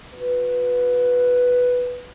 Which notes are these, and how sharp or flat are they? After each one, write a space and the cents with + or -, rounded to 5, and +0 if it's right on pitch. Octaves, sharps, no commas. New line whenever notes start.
F#4 -45 B4 +0